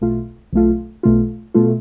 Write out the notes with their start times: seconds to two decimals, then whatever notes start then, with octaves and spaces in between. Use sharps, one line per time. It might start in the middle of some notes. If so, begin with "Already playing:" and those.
0.01 B1 B2 A3 F4
0.53 B1 B2 A3 F4
1.03 B1 B2 A3 F4
1.54 B2 A3 F4